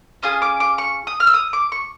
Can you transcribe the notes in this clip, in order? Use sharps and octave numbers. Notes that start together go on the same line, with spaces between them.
C#4 F4 G#4 D#6
D6
D6
C#6
D#6
F6
E6
D#6
D6
C#6